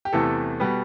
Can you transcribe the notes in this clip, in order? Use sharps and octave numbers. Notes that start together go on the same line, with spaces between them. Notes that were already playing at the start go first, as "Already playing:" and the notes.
G4
E2 C3 E3 A3 A4
B2 G3 B3